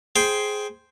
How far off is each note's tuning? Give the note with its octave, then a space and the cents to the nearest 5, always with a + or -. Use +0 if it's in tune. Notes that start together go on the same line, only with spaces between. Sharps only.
G#4 +10 C5 +0 G5 +0